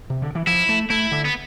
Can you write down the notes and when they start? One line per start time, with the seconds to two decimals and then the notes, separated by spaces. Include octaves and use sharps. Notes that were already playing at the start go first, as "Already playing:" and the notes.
0.10 C3
0.22 D3
0.35 E3
0.47 F3 E4
0.69 A3
0.90 A3 E4
1.11 D3
1.25 B3